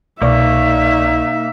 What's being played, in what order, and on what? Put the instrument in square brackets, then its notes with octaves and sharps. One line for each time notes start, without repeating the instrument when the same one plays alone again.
[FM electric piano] C2 D5 C#6 [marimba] B2 [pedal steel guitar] A#3 [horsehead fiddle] D#4 E5